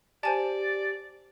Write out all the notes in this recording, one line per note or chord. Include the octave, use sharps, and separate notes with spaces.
G4 C5 D5 G#5 A5